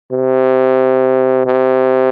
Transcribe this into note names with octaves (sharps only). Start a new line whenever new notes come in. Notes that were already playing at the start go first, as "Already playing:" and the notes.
C3
C3